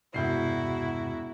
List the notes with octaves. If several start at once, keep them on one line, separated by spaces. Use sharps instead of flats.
E1 G2 C3 E4 F#4 G6 C7